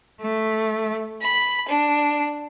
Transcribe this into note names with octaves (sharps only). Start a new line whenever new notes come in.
A3
B5
D4